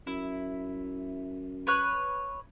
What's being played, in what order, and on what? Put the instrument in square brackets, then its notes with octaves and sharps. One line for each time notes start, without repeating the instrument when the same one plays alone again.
[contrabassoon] F#2 [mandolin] E4
[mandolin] B4 C#5 F#6